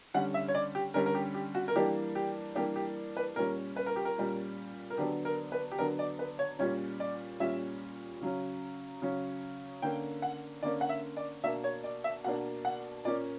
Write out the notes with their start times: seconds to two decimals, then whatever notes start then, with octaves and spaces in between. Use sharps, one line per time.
0.14 D3 G3 C#4 F#5
0.34 E5
0.48 C#5
0.55 D5
0.75 G4
0.94 D3 G3 C#4 A#4
1.06 A#4
1.15 G4
1.35 G4
1.55 F#4
1.68 A#4
1.75 E3 G3 A#3 D4 G4
2.15 G4
2.55 E3 G3 A#3 D4 G4
2.76 G4
3.17 B4
3.36 A#2 G3 C#4 A#4
3.76 B4
3.86 A#4
3.96 G4
4.05 A#4
4.18 A#2 G3 C#4
4.90 A#4
4.98 D3 F#3 B3 D4 G4
5.25 A#4
5.52 B4
5.72 G4
5.79 D3 F#3 B3 D4 A#4
5.99 D5
6.19 B4
6.39 C#5
6.59 A#2 G3 C#4 C#5
7.00 D5
7.40 A#2 G3 C#4 E5
8.21 C#3 F#3 C#4
9.02 C#3 F#3 C#4
9.82 D3 A#3 C#4 G5
10.22 F#5
10.63 D3 A#3 C#4 D5
10.81 F#5
10.89 E5
11.17 D5
11.43 B2 A#3 D4 E5
11.64 C#5
11.84 D5
12.04 E5
12.24 B2 A#3 D4 F#5
12.65 F#5
13.05 A#2 A#3 C#4 D5